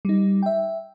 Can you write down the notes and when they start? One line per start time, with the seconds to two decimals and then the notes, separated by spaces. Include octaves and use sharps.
0.05 G3 D#4
0.43 E5 G5